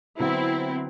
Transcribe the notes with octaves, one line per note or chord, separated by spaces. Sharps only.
D3 F#3 B3 C4 E4